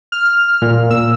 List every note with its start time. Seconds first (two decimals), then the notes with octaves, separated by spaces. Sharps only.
0.12 F6
0.62 A#2
0.91 E6